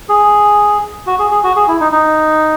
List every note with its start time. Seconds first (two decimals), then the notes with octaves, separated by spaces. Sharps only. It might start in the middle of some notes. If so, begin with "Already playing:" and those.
0.09 G#4
1.07 F#4
1.19 G#4
1.31 G#4
1.44 F#4
1.56 G#4
1.68 E4
1.81 D#4
1.92 D#4